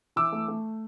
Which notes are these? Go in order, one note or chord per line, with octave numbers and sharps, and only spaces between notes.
E3 D6 E6
A3
A3